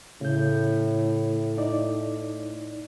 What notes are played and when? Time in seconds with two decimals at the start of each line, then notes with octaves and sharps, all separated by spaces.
0.21 A2 C#3 G6
1.58 D#4 D5